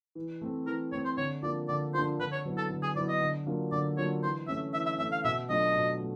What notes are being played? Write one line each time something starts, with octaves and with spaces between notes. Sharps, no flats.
E3
A3 C4
E3 A#4
A3 C4 C#5
C5
D3 C#5
F3 A#3 D4 D5
D3 D5
F3 A#3 D4 C5
D3 B4
C#5
F#3 B3 E4
A4
D3
G#4
F#3 B3 E4 D5
D#5
D3
F#3 A#3 D4 F4
D3 D5
F#3 A#3 D4 F4 C#5
E3 C5
A3 C#4 E5
E3 E5
E5
A3 C#4 E5
F5
B2 E5
F#3 A3 D4 F4 D#5
B2
A3